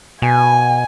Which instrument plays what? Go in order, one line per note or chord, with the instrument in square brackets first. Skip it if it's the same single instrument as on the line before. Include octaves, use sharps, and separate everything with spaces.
[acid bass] B2 [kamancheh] G#5